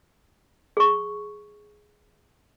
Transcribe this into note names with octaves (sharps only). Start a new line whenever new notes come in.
G#4 C#6